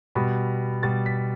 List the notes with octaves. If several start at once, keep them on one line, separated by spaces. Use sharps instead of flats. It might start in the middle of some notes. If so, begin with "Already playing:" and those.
B2 G3 B5
B2 G3 A6
B6